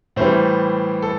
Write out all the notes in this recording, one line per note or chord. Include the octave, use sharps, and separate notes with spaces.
A2 E3 G3 C5
A4